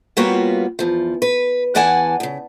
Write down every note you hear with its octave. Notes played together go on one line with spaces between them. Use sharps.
G3 A#3 B3 F4 F#4 C#5
E2 F3
B4
E2 E3 D5 F#5 G#5 A5
D#2 C#3